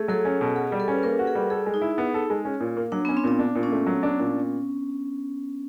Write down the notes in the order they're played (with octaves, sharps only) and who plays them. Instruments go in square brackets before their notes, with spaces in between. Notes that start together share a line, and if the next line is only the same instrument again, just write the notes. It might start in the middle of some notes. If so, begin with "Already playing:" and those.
Already playing: [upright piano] A3 [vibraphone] G#4
[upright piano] F#3 [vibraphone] A4
[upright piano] C#4
B2
[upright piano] F#4 [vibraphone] G#4
[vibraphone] G4
[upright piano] G3
[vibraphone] A4
[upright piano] C#4 [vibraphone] B4
[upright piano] A#3 [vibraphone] A#4
[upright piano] F#4
[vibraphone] G#4
[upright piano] G3
[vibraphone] G#4 [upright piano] A4
[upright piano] G#3
[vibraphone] D#4
[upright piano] E4
B3
A4
G#3
C#4
A#2
A#3
[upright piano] F#3 [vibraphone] D4
[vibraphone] B3
[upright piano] C#4
[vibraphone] C4
[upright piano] A#2 [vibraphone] B3
[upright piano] D4
A#2
[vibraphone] C#4
[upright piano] A3
F#3
D4
A#2